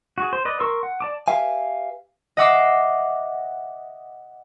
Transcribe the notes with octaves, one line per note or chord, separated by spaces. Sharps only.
F#4 G#4
C5
B4 D5 D#5
A#4 C6 C#6 E6
F#5
D5 A5 D6
G4 B4 E5 F5 G#5
D#5 E5 F#5 D6 E6 C7